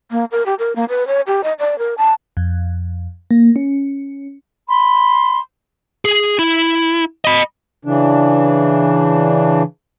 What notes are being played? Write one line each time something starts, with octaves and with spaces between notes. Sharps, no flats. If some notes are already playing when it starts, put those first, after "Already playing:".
A#3
A#4
G4
A#4
A#3
B4
C#5
G4
D#5
D5
A#4
A5
F2
A#3
C#4
B5 C6
G#4
E4
D#5 B5
C#3 E3 D4